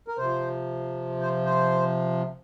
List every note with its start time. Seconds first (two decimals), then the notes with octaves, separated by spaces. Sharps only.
0.08 A#4
0.18 C3 F3 C5
1.21 C5
1.46 C5